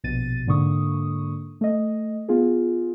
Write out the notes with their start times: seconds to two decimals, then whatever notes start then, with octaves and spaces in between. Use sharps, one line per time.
0.04 A#1 B2 A6 D#7
0.47 G#2 D3 A#3 C#6 D#6
1.61 A3 D#5
2.28 B3 F4 G#4